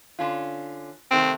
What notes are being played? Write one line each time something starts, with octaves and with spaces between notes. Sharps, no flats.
D3 C#4 F4
C3 D#3 A3 C4